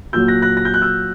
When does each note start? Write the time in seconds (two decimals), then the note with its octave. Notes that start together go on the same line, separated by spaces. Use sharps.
0.13 A#2 F#3 E6 G6
0.28 F#6 A#6
0.42 F#6 A#6
0.57 A#6
0.65 G6
0.74 F#6
0.82 E6 G6